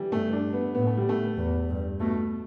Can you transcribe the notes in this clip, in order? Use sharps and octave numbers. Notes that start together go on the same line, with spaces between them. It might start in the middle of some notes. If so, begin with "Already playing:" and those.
Already playing: E3 G3
G2 A3
D4
B3
A2 B3
A3
G3
A3
E2
G2
B2 A3